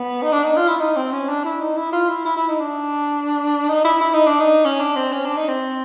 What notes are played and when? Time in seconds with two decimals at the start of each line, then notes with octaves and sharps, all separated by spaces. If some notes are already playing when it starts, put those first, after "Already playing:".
Already playing: B3
0.22 D#4
0.33 D4
0.44 D#4
0.57 F4
0.68 E4
0.80 D#4
0.96 C4
1.12 C#4
1.29 D4
1.45 E4
1.61 D#4
1.77 E4
1.92 F4
2.09 E4
2.25 E4
2.37 E4
2.49 D#4
2.60 D4
3.69 D#4
3.85 E4
4.01 E4
4.14 D#4
4.26 D4
4.40 D#4
4.65 C#4
4.80 D4
4.96 C4
5.13 C#4
5.25 D4
5.37 D#4
5.49 C4